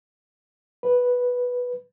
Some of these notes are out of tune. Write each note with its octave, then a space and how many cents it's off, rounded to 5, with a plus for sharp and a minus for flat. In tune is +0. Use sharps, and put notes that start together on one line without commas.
B4 -5